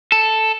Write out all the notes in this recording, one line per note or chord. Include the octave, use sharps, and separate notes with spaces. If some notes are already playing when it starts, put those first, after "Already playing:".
A4